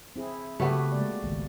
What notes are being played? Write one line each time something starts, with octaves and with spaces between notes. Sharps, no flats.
C4 E4 G#4
C#3 A3 B3 F#4 G4 C#5
G#3 A#3 D5
G#1 C#2 D#3